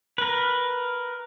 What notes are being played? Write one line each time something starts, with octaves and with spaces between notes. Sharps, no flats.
A#4 B4